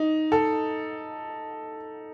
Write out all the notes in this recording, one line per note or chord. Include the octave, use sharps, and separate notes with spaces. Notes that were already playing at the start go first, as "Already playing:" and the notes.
Already playing: D#4
A4